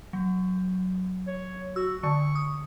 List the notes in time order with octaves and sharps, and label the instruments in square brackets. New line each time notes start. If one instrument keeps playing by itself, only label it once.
[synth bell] F#3
[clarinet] C#5
[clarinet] F#4 [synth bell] E6
[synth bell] D3 [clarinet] C#6
[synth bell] D#6